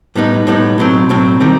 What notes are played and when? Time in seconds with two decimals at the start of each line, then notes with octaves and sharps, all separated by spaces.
0.15 A2 G3 B3 D#4
0.47 A2 G3 B3 D#4
0.78 B1 A2 F#3 C4
1.09 B1 A2 F#3 C4
1.40 D#3 G3 C4